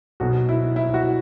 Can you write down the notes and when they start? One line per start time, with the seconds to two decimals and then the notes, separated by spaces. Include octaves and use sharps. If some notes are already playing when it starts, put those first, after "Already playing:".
0.20 B1 B2 F#4
0.49 E4
0.76 E4
0.94 F#4